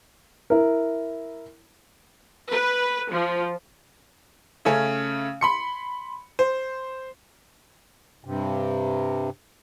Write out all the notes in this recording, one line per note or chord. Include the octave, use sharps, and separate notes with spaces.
E4 A#4
B4
F3
C#3 A3 C#4
B5 C6 C#7
C5
G2 C3